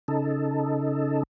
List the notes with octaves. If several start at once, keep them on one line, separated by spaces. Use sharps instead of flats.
C#3 D#4 A4